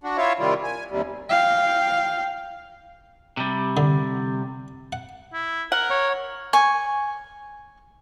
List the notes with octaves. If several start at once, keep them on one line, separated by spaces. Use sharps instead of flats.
D4 F#4
E4 F4 C#5 E5 F5
C3 D#3 G3 E4 F4
G#5
D#2 C3 G3
F5 G5
C3 G3
D3
F#5
E4
A#4 F#5
C#5
G#5 C#6